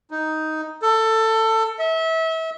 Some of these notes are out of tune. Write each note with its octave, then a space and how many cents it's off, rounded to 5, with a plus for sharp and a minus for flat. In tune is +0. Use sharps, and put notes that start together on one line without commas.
D#4 +5
A4 +20
E5 -30